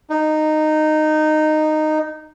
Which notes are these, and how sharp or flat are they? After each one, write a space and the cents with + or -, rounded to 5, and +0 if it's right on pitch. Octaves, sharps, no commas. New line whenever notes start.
D#4 -15